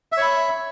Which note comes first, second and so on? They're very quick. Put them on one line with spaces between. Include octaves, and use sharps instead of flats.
E5 C#5 B5